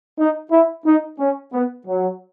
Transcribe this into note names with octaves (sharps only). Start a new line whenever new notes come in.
D#4
E4
D#4
C#4
B3
F#3